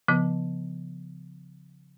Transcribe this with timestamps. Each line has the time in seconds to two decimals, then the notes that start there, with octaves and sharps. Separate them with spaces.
0.08 C#3 F3 B3